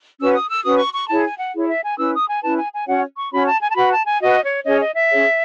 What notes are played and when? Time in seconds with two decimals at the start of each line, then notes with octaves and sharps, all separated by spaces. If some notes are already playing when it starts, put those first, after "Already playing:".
0.20 C#4 F#4 B4 E6
0.35 D#6
0.50 E6
0.65 C#4 F#4 B4 D#6
0.79 C#6
0.94 C#6
1.09 E4 G#4 C#5 A5
1.25 G#5
1.38 F#5
1.54 E4 G#4 C#5
1.68 E5
1.83 G#5
1.98 C#4 E4 B4 E6
2.13 D#6
2.28 G#5
2.42 C#4 E4 B4 A5
2.57 G#5
2.73 G#5
2.87 C#4 F#4 C#5 F#5
3.17 C#6
3.32 C#4 F#4 C#5 B5
3.46 A5
3.61 G#5
3.71 A5
3.76 F#4 B4 B5
3.91 A5
4.06 G#5
4.20 F#4 B4 D#5
4.44 C#5
4.65 C#4 G#4 C#5 D#5
4.81 D#5
4.95 E5
5.10 C#4 G#4 C#5